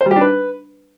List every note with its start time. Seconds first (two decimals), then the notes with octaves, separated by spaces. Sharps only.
0.01 C5
0.06 G3
0.11 G4
0.16 D4
0.21 B4